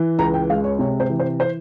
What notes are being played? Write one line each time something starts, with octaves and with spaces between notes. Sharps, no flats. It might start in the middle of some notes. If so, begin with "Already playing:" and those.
Already playing: E3
C#2 A#5
G5
G#3 F5
C#5
C3 C#5
C5
E3
C5
C5